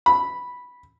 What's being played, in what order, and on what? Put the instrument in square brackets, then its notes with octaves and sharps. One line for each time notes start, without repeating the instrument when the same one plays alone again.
[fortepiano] B5